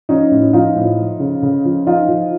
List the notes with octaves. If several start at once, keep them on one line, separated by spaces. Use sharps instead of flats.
F3 C#4 D#4
A2
F3 D#4 F4
A2
F3
C#3
C#3
F3
F3 D#4 F4
F3